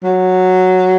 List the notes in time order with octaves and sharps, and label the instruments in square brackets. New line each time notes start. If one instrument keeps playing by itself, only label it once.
[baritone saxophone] F#3